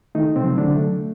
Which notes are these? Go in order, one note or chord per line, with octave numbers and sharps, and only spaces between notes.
D#3 A3 D#4
C3 C4
F#3
D3 D4
A3